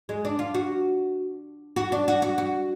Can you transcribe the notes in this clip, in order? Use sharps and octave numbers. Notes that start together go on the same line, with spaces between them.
G#3
D4
F4
F#4
F#4
D4
F#4
F#4
F#4